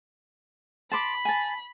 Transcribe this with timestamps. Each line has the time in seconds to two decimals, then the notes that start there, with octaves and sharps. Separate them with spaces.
0.92 A5 B5 C6 D6
1.25 G#5 A5